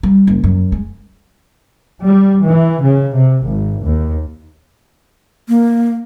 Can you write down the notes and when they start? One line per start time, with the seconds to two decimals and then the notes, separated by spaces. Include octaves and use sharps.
0.03 G3
0.27 F#1
0.44 F#2
0.72 G#3
2.05 G3
2.45 E3
2.81 C#3
3.14 C3
3.42 G#1
3.81 D#2
5.48 A#3